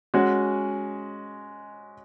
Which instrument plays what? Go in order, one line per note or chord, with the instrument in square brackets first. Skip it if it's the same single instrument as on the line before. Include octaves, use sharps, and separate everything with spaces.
[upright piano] G#3 C#4 F#4